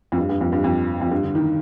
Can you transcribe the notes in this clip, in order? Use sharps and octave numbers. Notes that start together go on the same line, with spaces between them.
F2
G2
G2
F2
G2
F2
F2
G2
D3
D#3